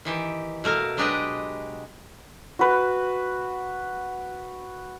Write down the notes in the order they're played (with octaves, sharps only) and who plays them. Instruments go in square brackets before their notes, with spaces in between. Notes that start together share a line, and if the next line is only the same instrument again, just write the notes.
[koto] D#3 E3 G4
B2 A3 A#4 F5
F#3 G#3 D4 G4 B4 D#5
[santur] F#4 B4